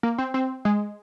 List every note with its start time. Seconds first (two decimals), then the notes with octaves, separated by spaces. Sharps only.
0.03 A#3
0.18 C4
0.34 C4
0.65 G#3